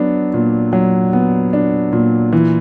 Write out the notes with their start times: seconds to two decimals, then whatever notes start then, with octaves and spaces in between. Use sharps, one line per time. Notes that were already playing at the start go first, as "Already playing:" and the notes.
Already playing: F#3 B3 D4
0.34 A#2
0.73 F#3
1.13 B3
1.53 D4
1.93 A#2
2.33 E3